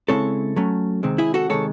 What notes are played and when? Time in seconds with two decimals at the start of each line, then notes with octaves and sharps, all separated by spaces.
0.09 C#3 G#3 C4 E4 A4 C#5
0.56 F#3 A3 C#4
1.03 C3 D#3 G#3 C4
1.18 E4 G#4
1.34 F#4 A4
1.50 C3 D#3 G#3 A4 C#5